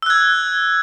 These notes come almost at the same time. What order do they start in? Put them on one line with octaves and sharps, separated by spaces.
E6 F#6 G#6